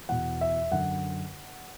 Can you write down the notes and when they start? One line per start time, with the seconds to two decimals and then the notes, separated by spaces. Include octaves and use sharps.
0.09 E2 B2 F#5
0.41 E5
0.72 F#2 D3 F#5